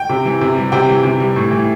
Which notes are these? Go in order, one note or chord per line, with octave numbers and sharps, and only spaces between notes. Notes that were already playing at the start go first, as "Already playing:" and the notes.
Already playing: G5
C3
E3
C3
G3
C3 G5
E3
C3
G3
A2
E3